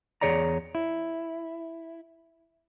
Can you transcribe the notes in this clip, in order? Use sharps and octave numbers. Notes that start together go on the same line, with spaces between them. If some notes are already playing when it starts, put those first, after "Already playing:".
E2 E3 G#4 C#5 D5 A#5
E4